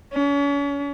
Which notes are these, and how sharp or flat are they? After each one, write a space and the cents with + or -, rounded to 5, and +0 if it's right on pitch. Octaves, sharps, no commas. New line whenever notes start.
C#4 +40